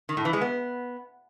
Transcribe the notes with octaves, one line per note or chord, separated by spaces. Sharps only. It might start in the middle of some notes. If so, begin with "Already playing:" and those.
D#3
A2
E3
G#3
B3